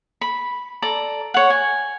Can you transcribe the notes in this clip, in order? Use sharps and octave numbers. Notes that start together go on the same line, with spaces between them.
B5
A4 D5 A#5
C#5 F#5
G#5